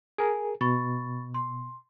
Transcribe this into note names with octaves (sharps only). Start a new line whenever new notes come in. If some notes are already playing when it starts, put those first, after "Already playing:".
G#4 A#4 G#5
B2 B5 C#6 A6
C6